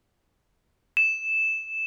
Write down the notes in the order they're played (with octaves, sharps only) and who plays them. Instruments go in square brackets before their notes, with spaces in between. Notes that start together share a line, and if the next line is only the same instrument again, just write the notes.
[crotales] E7